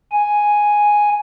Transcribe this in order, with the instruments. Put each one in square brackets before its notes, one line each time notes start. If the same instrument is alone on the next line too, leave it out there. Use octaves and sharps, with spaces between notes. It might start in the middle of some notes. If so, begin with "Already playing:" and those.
[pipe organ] G#5